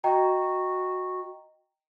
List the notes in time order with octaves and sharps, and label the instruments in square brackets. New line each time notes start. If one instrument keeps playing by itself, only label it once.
[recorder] F#4 [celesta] D#5 G5 A#5